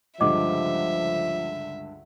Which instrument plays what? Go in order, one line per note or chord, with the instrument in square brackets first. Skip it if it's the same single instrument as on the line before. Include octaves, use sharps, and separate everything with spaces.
[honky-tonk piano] C#2 G2 D3 [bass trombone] F3 [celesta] D#5 D6 [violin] E5